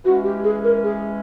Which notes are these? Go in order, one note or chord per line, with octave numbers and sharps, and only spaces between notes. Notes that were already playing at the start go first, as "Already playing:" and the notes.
E3 G#3 C#4 F#4
G4
G#4
A#4
G#4